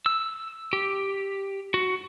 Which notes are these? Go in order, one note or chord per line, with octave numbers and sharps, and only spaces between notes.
E6
G4
F#4